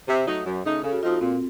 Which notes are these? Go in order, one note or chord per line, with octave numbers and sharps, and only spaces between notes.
C3
F#3 A3 D#4
F#2
C#3 A3 D#4
C#3 A4
F#4
F3 C4 D#4 F4
F#4
A#2 C4